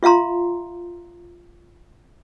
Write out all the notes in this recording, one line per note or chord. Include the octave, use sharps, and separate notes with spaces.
F4 E5 F5 A#5 C6